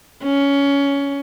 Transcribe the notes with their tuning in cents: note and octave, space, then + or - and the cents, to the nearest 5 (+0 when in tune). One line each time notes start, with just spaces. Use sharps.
C#4 +15